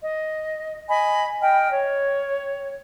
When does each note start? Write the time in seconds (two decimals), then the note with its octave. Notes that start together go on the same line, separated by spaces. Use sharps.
0.02 D#5
0.89 D#5 G#5 B5
1.42 D#5 G5 F6
1.72 C#5